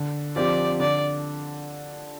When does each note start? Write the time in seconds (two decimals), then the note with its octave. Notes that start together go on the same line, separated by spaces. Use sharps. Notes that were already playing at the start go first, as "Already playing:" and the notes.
Already playing: D3
0.36 F3 C4 G4 D5
0.80 D3 D5